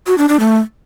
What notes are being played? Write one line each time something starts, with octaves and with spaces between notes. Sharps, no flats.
F#4
D4
D4
A3